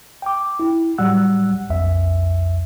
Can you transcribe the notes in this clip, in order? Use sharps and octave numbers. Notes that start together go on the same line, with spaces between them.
G5 D6
E4
A2 F#3 G3 F#5 E6 F#6
B1 F2 E5